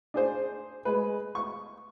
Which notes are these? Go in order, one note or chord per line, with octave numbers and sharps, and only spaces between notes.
D4 G#4 C5
G#3 B4
C#6